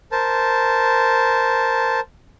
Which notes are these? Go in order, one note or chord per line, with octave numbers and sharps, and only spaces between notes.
A#4 C5 A5